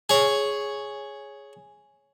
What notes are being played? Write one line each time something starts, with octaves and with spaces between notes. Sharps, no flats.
G#4 C#5